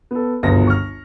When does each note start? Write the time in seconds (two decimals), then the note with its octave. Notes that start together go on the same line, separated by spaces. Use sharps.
0.11 B3 A4
0.43 G1 C#2 F#2 B2 G#4 A#6
0.67 C#6 F6